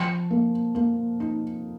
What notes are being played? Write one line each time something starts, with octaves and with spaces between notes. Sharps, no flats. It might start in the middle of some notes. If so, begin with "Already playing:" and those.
Already playing: F3
A#3
A#3
D#4